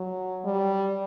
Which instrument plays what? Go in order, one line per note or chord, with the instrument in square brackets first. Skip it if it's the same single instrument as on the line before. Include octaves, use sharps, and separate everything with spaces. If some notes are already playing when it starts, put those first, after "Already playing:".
Already playing: [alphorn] F#3
G3